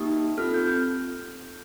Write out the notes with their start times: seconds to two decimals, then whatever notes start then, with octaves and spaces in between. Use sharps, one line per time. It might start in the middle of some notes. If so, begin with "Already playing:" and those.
Already playing: A#3 D#4 G4 D#6
0.37 C4 F4 A4 F6
0.54 G6